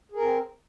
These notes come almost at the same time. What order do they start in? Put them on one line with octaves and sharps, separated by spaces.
G#4 A#4 C4